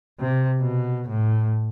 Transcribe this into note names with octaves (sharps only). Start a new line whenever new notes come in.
C3
B2
A2